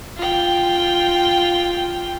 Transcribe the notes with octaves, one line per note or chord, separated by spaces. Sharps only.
F4 G5